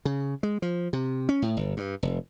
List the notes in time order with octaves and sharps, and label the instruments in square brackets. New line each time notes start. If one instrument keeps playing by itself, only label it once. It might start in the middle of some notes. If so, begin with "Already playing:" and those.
[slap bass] C#3
G#3
F3
C3
C#4
A2
G1
G2
F1